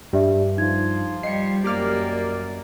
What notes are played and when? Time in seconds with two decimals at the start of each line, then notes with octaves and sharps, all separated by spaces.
0.13 G2 G4 D5 E5
0.58 F3 D#4 F4 G#6
1.23 G3 D#5 C7 C#7
1.64 F#2 A#3 G4 D5 D6 F6